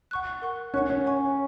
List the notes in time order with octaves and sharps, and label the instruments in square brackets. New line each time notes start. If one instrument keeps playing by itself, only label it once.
[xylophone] F#5 C#6 F#6
A#4 F#5 C#6 F#6
[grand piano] C#4 [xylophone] F#5 C#6 F#6
[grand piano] C#4
[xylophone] C#5 G#5 C#6